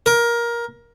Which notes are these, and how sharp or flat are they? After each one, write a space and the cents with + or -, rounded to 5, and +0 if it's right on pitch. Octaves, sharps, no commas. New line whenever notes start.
A#4 +15